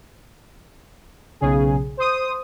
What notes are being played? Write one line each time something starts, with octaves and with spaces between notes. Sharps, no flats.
B1 C#3 G#4
C5 D#6